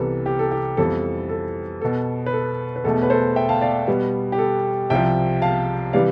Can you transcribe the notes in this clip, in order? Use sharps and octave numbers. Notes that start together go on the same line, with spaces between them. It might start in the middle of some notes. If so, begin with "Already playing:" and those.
Already playing: C2 C3 E3 B3 A4
G4
A4
G4
F2 E3 G3 B3 A4
A4
B2 B3 A4
B4
A4
B4
E2 B2 A3 A4
B4
A4 C5
E5 G5
F5 A5
D5 F5
B2 G3 B3
G4
A4
C2 C3 F3 E5 G5
F5 A5
C3 E3 G3 D5 F5